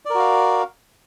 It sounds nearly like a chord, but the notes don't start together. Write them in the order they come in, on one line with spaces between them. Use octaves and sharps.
D5 A#4 F#4 F5